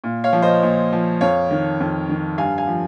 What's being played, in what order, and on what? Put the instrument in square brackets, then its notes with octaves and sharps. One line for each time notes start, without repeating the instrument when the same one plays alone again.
[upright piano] A#2
C#5 F5
F3
C5 D#5
A#2
F3
F2 C#5 F5
D#3
F2
D#3
G2 F5 G#5
F5 G#5
F3